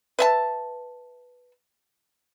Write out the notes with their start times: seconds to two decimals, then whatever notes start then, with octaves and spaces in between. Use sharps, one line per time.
0.19 B4 E5 A5